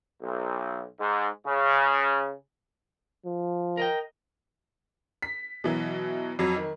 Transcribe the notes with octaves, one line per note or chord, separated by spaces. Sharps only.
B1
G#2
C#3
F3
A#4 D#5 G5
B6
B2 E3 F#3
F2 F#3
D#3